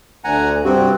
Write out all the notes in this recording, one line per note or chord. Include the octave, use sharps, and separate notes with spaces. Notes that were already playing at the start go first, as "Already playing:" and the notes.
D2 F#5 G#5 A#5
G2 C3 C4 F#4